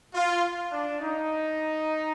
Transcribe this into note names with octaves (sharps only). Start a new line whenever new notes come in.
F4
D4
D#4